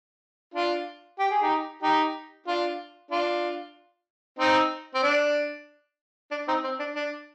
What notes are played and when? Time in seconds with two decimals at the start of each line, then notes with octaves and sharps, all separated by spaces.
0.54 D4 F4
1.19 G4
1.31 G#4
1.42 D#4 G4
1.83 D#4 G4
2.47 D4 F4
3.11 D4 F4
4.39 C4 D#4
4.95 C4
5.03 D4
6.31 D4
6.48 C4 D#4
6.64 C4
6.80 D4
6.96 D4